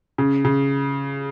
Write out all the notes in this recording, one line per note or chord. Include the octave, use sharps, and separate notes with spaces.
C#3
C#3